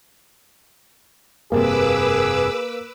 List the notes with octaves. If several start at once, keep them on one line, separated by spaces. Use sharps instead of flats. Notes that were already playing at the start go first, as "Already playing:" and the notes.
F1 G2 C3 A#3 G#4 B4 D6 E6